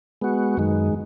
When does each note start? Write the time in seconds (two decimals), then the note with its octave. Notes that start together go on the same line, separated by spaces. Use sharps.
0.21 G#3 B3 F#4
0.57 F#2 D#3 G#3